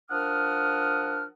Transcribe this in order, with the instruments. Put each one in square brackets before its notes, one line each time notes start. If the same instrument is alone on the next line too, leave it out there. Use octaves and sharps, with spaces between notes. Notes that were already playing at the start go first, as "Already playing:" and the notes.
[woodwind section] F3 D4 A#4 F#5 D#6 F6